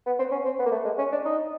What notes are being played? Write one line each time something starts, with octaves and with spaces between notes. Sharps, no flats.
B3
C4
C#4
C4
B3
A#3
A3
G#3
C#4
D4
D#4